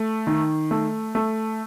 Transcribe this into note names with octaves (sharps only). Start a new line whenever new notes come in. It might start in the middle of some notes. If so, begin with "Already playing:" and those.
Already playing: A3
D#3
A3
A3